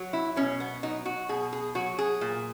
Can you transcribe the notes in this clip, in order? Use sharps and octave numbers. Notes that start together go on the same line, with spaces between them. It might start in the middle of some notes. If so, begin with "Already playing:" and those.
Already playing: F#3
E4
B2 C#4
B3
F#3 D#4
F#4
B2 G#4
G#4
F#3 F#4
G#4
A#2